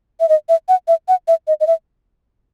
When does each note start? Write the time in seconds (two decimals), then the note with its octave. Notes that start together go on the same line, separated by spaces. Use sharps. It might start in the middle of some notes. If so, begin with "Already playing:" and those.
0.20 E5
0.29 D#5
0.49 E5
0.69 F#5
0.88 E5
1.08 F#5
1.28 E5
1.48 D#5
1.60 D#5
1.67 E5